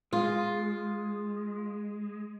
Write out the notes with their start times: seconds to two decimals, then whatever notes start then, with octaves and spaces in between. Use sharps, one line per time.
0.13 G#3 F4